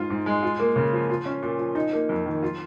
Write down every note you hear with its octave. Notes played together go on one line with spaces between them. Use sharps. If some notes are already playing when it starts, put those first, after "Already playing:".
Already playing: G#2 F4
G#2
G#3
F4
A#3
C#3
F3
F4
C#4
A#2
F3
D#4
A#3
F2
D#3
F4